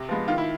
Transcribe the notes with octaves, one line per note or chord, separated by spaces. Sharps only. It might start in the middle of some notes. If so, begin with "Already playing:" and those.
Already playing: C3
F3 G#3 B3
D#3 F4
E4